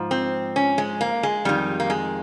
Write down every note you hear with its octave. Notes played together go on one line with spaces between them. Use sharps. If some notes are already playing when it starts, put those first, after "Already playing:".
Already playing: G#2 F3
C4
C#4
G#3
A#3
G#3
F2 D#3 G3
A#3
G#3